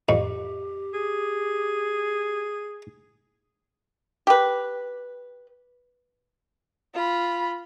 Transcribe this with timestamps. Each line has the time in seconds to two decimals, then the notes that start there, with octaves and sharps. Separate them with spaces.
0.09 F2 G4
0.94 G#4
4.27 G4 B4
6.94 F4 B5